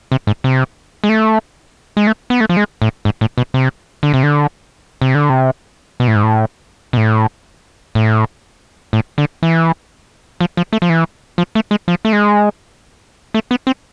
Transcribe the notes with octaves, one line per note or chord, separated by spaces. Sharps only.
C3
G#2
C3
G#3
A3
G#3
A3
B3
A3
F3
G#3
A2
G#2
A2
B2
C3
D3
C3
D3
C3
D3
C3
B2
A2
G#2
A2
B2
A2
A2
A2
D3
E3
F3
F3
A3
F3
E3
F3
A3
G#3
F3
A3
G#3
A3
B3
C4